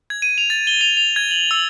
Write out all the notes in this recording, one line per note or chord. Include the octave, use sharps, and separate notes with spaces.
G#6
D#7
F7
A6
G7
F7
F7
G#6
F#7
E6